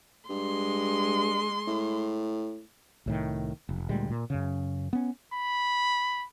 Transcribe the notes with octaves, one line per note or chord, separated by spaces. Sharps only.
G2 G#3 C6
A2
C2 A2 D#3
F1
D2 A#2 G3 G#3
A#2
F#2 C#3
B3 C#4
B5